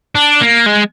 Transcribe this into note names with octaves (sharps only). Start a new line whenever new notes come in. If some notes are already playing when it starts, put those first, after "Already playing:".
D4
A#3
G#3